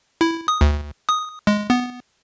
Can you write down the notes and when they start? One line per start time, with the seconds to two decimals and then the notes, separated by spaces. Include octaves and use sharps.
0.21 E4
0.48 D#6
0.61 D2
1.09 D#6
1.47 G#3
1.70 B3